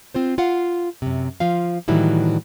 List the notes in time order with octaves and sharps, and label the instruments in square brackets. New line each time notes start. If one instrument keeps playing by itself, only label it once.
[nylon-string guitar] C4 F4 C5
F4 F5 F#5
F#2 C3
F3 F4 F5
A2 D#3 E3 F#3 G3 E4